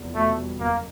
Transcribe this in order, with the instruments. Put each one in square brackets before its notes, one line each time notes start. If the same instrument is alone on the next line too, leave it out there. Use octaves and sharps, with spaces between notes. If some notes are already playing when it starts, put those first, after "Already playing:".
Already playing: [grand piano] F1 E2 F3
[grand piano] B2 [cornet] A3
[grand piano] G3
[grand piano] F#1 [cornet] A#3